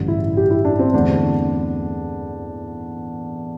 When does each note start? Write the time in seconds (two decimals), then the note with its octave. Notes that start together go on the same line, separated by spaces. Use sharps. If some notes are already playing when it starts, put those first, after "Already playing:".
Already playing: A1 G2 D3
0.08 E4
0.37 G4
0.50 E4
0.65 D4
0.79 C4
0.93 E2 D3 A3 D4